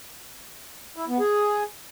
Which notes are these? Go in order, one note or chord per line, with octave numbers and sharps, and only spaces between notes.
E4
B3
G#4